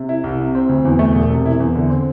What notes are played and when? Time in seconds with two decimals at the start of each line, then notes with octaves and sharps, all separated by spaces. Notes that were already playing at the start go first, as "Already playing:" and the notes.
Already playing: C3
0.09 E4
0.24 C2
0.39 C3
0.55 C4
0.69 D2
0.85 E2
0.99 A3
1.15 E1
1.30 C3
1.46 E4
1.60 E2
1.76 D3
1.90 C4